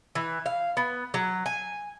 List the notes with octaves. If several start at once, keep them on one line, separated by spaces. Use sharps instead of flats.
E3
F5
B3
F#3
G#5